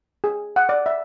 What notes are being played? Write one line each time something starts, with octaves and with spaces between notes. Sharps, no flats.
G#4
F#5
D5
E5